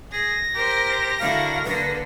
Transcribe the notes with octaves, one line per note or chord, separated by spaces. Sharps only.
G#4 A#6
G4 A#4 C5
D3 E4 F#4 A#4 F5
D3 A#3 B4